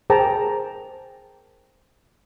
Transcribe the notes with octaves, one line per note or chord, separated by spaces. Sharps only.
G#4 A#4 C5 G5 A5 A#5